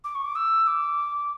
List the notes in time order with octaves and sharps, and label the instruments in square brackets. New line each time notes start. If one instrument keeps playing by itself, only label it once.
[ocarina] D6
C#6
D6
E6
D6